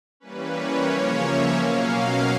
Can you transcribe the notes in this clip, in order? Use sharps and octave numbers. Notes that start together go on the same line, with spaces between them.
E3 G3 A#3 C#4 B4
C#5
C#3 F3 A#3 C#4
E5
B2 F#3 A#3 C#4 F5